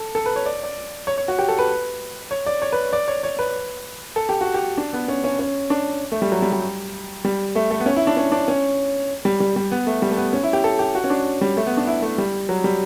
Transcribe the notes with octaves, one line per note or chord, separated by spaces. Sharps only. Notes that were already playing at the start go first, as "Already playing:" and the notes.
Already playing: A4
A4
B4
C#5
D5
D5
C#5
C#5
F#4
G4
A4
B4
C#5
D5
C#5
B4
D5
C#5
C#5
B4
A4
G4
F#4
G4
D4
B3
C#4
C#4
C#4
D4
A3
G3
F#3
G3
G3
G3
A3
A3
B3
C#4
E4
D4
C#4
D4
C#4
G3
G3
G3
B3
A3
G3
A3
B3
C#4
E4
G4
A4
G4
F#4
C#4
D4
G3
A3
B3
D4
E4
A3
G3
F#3
G3